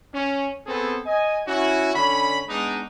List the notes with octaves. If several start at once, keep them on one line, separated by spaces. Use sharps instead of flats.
C#4
B3 C4 G#4 A4
D#5 G#5
C#4 E4 F#4
D3 C#4 B5
G#3 B3 D4 D#4